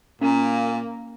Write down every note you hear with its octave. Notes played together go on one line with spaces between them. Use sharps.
A#2 A#3 C#4